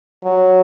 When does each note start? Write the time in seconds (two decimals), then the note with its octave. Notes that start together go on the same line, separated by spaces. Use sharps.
0.24 F#3